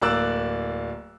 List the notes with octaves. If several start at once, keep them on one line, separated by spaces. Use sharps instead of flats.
D1 A#3 D5 E6 F#6 E7